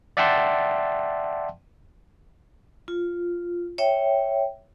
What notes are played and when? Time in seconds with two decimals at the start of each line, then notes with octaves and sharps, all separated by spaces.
0.17 D5 E5 F#5 G5 A5 C6
2.88 F4
3.78 C#5 E5 G5